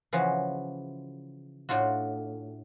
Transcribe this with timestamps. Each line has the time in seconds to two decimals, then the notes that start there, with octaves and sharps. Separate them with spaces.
0.13 C#3 E3 F3 F#4
1.69 A2 D4 F4 F#4